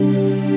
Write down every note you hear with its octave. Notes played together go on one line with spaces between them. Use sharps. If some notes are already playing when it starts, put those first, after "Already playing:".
Already playing: C3 G3 D4 G4